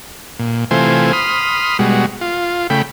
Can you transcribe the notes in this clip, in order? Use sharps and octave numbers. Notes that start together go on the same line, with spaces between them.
A#2
C3 E3 A3 F4 C5 G#5
B5 C6 D#6 F6
B2 G3 G#3 F#4
F4
C#3 A3 G5 B5